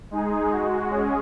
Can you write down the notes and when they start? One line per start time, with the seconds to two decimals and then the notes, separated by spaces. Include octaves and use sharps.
0.11 G#3 D#4 G#4
0.51 G#3 F#4
0.90 G#3 C#4 G#4